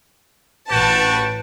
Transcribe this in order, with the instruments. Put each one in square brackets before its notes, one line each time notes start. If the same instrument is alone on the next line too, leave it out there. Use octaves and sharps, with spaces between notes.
[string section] A1 B4 A5 [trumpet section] F#4 G5